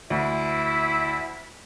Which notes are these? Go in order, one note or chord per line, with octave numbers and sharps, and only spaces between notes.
D2 E4 E5